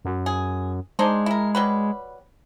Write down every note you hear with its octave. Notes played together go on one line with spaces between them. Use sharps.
F#2
G#4
G#3 D4 D#4 C5
E4 A#4
F#3 G3 B4